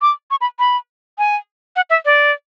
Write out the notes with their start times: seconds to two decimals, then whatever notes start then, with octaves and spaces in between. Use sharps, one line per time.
0.02 D6
0.31 C#6
0.41 B5
0.59 B5
1.18 G#5
1.76 F#5
1.90 E5
2.05 D5